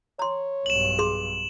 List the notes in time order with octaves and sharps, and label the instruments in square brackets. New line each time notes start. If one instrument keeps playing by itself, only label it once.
[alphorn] C#5 [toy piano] A#5 C6
[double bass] B1 G2 [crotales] E7 F#7
[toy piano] G#4 C6